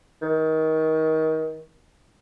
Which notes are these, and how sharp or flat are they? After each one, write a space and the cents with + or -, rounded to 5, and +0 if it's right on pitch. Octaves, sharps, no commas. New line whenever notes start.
D#3 +25